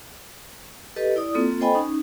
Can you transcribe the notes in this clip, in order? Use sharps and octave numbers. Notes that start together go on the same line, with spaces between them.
G4 A4 B4 D#5
E4 D5 D#6
A#3 C4 F4 A4
A4 C5 D#5 G5 G#5 B5
C#4 D#4